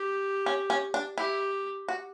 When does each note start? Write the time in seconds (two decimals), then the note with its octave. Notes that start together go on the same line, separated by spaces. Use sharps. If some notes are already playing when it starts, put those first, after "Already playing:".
Already playing: G4
0.46 C#4
0.70 C#4
0.94 D4
1.18 E4 G4
1.88 F#4